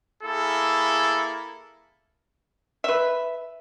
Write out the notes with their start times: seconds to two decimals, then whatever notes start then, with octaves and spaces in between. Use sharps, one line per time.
0.24 A#3 E4 G#4 A4
2.84 B4 E5